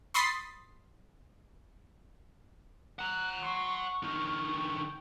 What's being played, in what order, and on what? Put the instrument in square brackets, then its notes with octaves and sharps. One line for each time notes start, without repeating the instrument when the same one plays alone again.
[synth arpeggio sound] B5 C6 D#6 A6 B6 C7
[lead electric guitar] F#5 A#5 [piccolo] F#6
[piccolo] C6 [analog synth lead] C#6
[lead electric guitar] D3 D#4 [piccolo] F6
[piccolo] G5